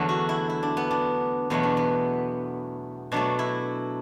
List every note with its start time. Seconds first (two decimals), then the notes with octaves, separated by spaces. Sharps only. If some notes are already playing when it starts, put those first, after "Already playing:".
Already playing: E2 D3 F#3 A3
0.09 F#4
0.29 E4
0.49 E4
0.63 D4
0.77 B3
0.91 D4
1.50 E2 B2 F#3 A3 B3
1.63 D4
1.77 B3
3.12 B2 F#3 A3 D4
3.39 E4